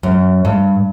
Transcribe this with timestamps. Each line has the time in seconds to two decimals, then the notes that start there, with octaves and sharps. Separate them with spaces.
0.03 F#2
0.45 G2